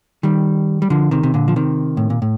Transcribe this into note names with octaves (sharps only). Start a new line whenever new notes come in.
D#3 G3
G3
D3 F3
C3 D#3
C3
A#2 D3
F3
C3 D#3
A2
A#2
A2